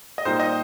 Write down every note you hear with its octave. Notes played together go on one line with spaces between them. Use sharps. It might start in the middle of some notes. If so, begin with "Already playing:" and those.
D#5
A#2 G3 A#3 D#4 C5
D#5